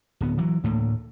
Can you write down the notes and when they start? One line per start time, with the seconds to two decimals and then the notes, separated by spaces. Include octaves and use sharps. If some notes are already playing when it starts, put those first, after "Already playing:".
0.21 D1 B3
0.38 E3 F#3
0.64 D2 A2 A3 A#3